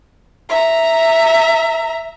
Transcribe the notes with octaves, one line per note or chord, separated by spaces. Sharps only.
E5 A#5